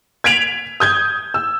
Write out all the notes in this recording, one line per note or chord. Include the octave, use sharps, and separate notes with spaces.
G#6 B6 D7 F7 F#7
D#6 G6 G#6
E6